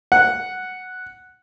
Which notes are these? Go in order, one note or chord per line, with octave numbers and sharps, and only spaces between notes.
F#5